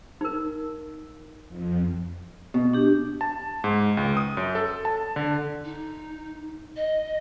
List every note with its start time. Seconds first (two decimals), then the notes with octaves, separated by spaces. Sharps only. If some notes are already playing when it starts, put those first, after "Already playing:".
0.21 D#4 A#4
1.48 F2
2.54 B2
2.74 D4 G4
3.21 A5
3.64 G#2
3.97 C#2
4.17 D#6
4.37 F#2
4.55 A4
4.85 A5
5.16 D3
5.65 D#4
6.76 D#5